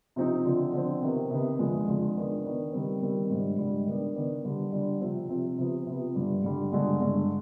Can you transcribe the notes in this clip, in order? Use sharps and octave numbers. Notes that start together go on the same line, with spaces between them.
C3 F3 C4 D#4
D3 F3 C4
D3 F3 C4
C3 D#3 B3
C3 D#3 B3
F2 D3 G#3
F2 D3 G#3
D#3 B3 D4
D#3 B3 D4
D#3 G3 C4
D#3 G3 C4
G#2 G3 D4
G#2 G3 D4
D#3 B3 D4
D#3 B3 D4
D3 G3 D4
D3 G3 D4
C3 F3 C4
C3 F3 C4
C3 F3 B3
C3 F3 B3
G2 D3 G3 D4
G2 D3 G3 D4
G2 D3 G#3
G2 D3 G#3